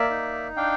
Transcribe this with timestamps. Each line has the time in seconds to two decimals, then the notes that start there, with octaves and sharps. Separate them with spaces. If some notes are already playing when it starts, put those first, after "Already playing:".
Already playing: A#3 D5 E5
0.10 D#4
0.57 D4 F5 G5